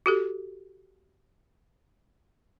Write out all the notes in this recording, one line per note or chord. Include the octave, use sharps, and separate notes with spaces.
F#4 G4 A4